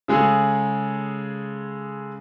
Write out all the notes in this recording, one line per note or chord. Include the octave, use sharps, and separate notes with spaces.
C#3 G#3 G#4 A4